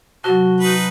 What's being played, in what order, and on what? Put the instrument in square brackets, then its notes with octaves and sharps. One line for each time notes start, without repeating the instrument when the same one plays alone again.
[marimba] C3 F#3 [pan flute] F#4 [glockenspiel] A5 F#6 G7
[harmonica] D#4 B4